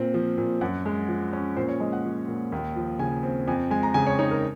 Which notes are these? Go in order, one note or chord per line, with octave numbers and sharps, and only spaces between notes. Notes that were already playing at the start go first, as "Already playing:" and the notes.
Already playing: A#2 C4
F3
A#2
F#2 F#5
G#3
F3
C#4
A#2 C5
C#5
G#3 D#5
F#5
F3
A#2
D#2
F3
C#3 G#5
C4
F2 G#5
G#3 G#5
A#5
C#3 G#5
C#5
D#4 C#5
A#4